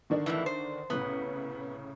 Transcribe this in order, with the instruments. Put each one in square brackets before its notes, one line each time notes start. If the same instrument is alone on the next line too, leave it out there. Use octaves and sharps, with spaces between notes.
[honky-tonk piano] D3 D#3 D4
[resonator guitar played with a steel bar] F2 A2 E3
C5
[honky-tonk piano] C2 A2 C#3 [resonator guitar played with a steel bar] B3